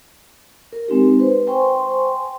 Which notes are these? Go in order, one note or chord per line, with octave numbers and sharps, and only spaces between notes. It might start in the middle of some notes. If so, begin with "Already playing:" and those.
A#4
G#3 C4 D#4 G4
B4 C5
C5 G5 G#5 C6 C#6